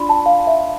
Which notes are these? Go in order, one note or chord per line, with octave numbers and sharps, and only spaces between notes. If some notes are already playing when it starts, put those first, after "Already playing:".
Already playing: D4 F4 D5 B5 C6
A5
F5
E5